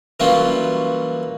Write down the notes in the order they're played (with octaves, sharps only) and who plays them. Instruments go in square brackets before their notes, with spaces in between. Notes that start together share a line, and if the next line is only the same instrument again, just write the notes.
[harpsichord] E3 F#3 G3 A#3 C#4 F4